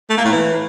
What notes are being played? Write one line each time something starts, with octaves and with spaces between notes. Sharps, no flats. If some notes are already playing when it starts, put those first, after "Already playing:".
A3
A#3
A2
E3